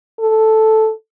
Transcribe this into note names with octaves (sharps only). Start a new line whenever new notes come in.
A4